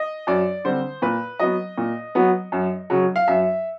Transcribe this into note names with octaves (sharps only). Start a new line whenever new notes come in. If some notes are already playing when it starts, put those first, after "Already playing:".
Already playing: D#5
F#2 D5
D3 G3 C4 C5
A#2 B4
F#3 B3 D#5
A#2
F#3 B3
F#2
C#3 F#3
F5
F#2 E5